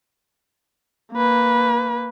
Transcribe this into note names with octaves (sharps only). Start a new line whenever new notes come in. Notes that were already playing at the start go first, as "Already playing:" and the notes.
A#3 B4